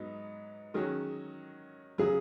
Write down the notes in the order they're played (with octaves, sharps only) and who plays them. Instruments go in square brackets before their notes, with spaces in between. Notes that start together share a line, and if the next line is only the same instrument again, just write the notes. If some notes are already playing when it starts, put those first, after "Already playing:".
Already playing: [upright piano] G#2 F#3 B3 D#4
[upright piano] D#3 F#3 C#4 F#4 [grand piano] G#4
[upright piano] C#3 F#3 [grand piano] G#4